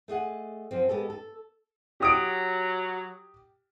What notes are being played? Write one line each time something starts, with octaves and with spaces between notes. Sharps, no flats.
A3 G#4 D#5 F#5
F#2 F3 C4
G#3 B3 G4 A4
A4
F#3 G4 D#6 D7